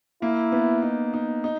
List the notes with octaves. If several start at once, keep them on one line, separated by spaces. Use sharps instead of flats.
A#3 E4
B3
D#4
D#4
D#4